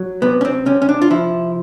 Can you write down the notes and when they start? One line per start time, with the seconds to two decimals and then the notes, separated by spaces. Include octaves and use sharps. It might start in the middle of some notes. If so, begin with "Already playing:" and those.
Already playing: F#3
0.22 C3 B3
0.41 C#4
0.45 C4
0.66 C3 C#4
0.82 C#4
0.89 D4
1.02 F4
1.11 F3 E4